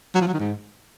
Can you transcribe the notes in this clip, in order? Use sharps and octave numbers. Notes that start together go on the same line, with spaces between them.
F#3
F3
F#3
D#3
G#2